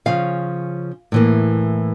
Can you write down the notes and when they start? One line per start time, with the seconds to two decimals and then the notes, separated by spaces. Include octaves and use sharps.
0.06 C#3 F3 C#4 F5
1.12 A2 E3 A#3